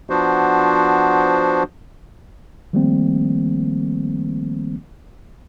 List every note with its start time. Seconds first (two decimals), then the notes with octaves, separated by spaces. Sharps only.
0.10 F3 B3 D4 F#4 C5
2.73 D#3 F3 G3 A3 A#3 C4